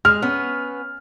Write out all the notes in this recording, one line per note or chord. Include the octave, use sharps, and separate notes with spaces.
G#3 F6
B3 C#4